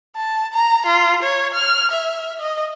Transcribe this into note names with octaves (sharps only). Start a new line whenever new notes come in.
A5
A#5
F4
C#5
F6
E5
D#5